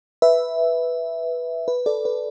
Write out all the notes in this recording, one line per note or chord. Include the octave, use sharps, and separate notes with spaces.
B4 E5
B4
A4 D5
B4